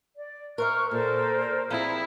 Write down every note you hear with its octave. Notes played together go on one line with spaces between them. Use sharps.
D5
A#4 C5 E5 C#6 F6 F#6
A#2 A4 A#4 C5 D5
F3 C4 E4 G#4 D5 A#5 B5